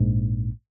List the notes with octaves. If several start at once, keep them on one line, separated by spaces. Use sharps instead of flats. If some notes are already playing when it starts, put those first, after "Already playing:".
Already playing: A#1 G#2